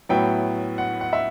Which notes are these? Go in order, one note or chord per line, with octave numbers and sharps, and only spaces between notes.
A2 F#3 B3 E4 G5
F#5
F#5
E5